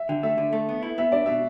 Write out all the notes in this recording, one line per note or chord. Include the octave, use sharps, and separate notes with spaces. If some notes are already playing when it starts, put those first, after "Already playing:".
Already playing: E5
D3 G5
A3 E5
D3
A3
B3
E4
B3 E5
D4 D5
B2 E5